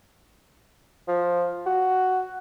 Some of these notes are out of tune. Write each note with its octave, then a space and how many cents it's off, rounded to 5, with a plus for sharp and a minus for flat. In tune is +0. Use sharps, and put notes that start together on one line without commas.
F3 +5
F#4 +5